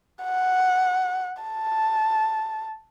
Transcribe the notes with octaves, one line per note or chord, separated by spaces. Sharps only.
F#5
A5